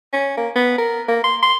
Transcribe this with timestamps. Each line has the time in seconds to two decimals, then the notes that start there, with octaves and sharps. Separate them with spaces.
0.13 C#4
0.37 A#3
0.56 B3
0.78 A#4
1.08 A#3
1.24 C6
1.43 C6